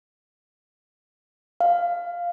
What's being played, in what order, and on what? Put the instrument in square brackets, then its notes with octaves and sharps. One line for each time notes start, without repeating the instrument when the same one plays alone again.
[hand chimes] F5